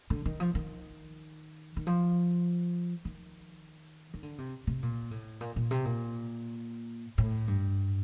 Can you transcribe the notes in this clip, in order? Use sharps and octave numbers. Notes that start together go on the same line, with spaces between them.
D3
D#3
F3
D#3
D#3
F3
D#3
D#3
D3
C3
C3
A#2
A2
A#2
A#2
C3
A#2
A2
G2